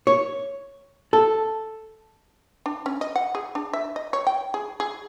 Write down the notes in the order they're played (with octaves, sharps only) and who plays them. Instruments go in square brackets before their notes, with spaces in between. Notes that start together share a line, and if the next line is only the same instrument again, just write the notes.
[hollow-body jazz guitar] C#5
A4
[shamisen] D4
C#4
D#5
F#5
G#4
D4
E5
D#5
C#5
G5
G#4
G#4